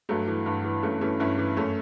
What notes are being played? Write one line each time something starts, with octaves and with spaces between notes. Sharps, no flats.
G2 F#3 A3
E3
G2
E3
G2 A3 C#4
E3 A3 C#4
G2 C#4 E4
E3
F#2 A3 C#4